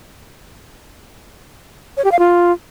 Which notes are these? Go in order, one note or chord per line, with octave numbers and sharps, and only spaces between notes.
C#5
G4
F5
F4